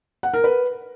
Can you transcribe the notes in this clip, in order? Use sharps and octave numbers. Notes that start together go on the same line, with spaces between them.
F#5
A#4
B4